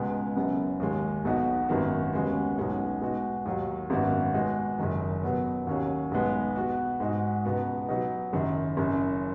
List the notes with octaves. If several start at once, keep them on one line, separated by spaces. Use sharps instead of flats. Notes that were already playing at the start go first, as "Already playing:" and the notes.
Already playing: C#2 B2 G#3 B3
F#1 F#2 C#3 B3
D#2 D#3 G#3
B1 B2 B3 D#4 F#4
G#1 F#2 D#3 B3 F#4
D#2 C#3 G#3 B3 F#4
B1 B2 G#3 C#4 F#4
B2 G#3 D#4 F#4
D#2 D#3 F#3
G#1 F#2 D#3 B3 F#4
B2 G#3 D#4 F#4
F#1 F#2 D#3
B2 F#3 B3
D#2 D#3 F#3 C#4 F#4
B1 B2 G#3 B3
B2 B3 F#4
G#2 G#3 D#4 F#4
C#2 B2 B3 F#4
B2 F#3 B3 D#4
F#1 F#2 D#3
F#1 F#2 C#3